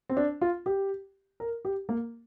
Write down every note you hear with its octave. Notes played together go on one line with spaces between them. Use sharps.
C4
D4
F4
G4
A#4
G4
A#3